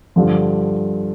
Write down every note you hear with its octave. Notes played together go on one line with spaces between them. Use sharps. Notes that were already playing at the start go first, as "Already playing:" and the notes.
G2 D3 F3